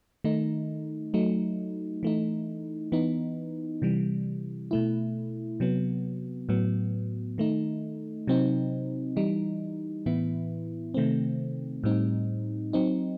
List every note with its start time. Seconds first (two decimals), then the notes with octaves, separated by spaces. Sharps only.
0.24 D#3 A3 D#4
1.14 F#3 A3 D#4
2.03 E3 A3 D#4
2.92 E3 B3 D#4
3.82 C3 E3 G3
4.71 B2 A3 E4
5.60 C3 F#3 B3
6.49 A2 F#3 B3
7.38 D#3 A3 D#4
8.27 C3 F#3 C4 D#4
9.16 E3 G3 D#4
10.06 A2 E3 B3 E4
10.94 C3 D#3 A3 C4
11.84 A2 G3 C4 D#4
12.73 F#3 C4 D#4